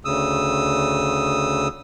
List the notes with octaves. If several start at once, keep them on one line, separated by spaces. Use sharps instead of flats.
D2 C#3 D#6 E6